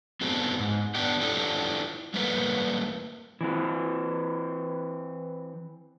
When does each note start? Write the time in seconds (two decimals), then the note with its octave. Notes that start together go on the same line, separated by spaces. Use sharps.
0.21 B3 C4 F#4 G#4 A4
0.59 G#2
0.95 B3 D4 G4 G5
1.21 D4 E4 F4 G4 A4 G5
2.14 G3 A3 A#3 A#4 B4
3.41 E3 C4